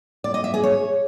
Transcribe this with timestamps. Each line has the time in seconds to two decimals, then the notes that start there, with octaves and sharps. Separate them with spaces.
0.24 D5
0.34 D#5
0.44 E5
0.54 G#4
0.64 C#5